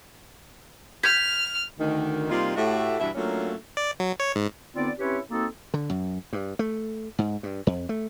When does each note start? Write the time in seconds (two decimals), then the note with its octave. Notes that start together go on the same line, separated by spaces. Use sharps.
1.03 F6 G6 G#6 B6
1.79 D2 D#3
2.29 C3 G3 A#3 D#4 F4
2.56 A2 A3 F#4 G4 E5
2.99 E2 G2 B2 E4 E5
3.15 F#3 A3 A#3 C#4 D4 F4
3.77 D5
4.00 F#3
4.20 C#5
4.36 G#2
4.75 D3 B3 C4 D#4 F4 D5
4.99 C4 C#4 E4 G4 B4 C#5
5.31 A#3 C4 D#4 F#4 A4
5.74 D3
5.90 F#2
6.33 G2
6.59 A3
7.19 G#2
7.43 G2
7.67 F2
7.89 A3